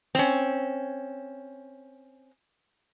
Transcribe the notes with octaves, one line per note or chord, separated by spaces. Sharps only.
C4 C#4